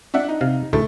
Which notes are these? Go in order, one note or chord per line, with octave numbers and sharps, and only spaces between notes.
D4 E5 F#5
D#4
C3 F5
D2 A2 A3 A4